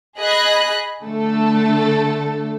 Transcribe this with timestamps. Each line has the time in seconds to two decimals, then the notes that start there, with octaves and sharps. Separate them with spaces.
0.18 G#4 D#5 B5 F#6
1.03 D3 A3 A4